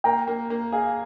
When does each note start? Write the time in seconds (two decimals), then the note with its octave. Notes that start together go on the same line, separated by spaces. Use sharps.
0.04 A#3 G5 A#5
0.28 A#3
0.50 A#3
0.72 G#4 F5 G#5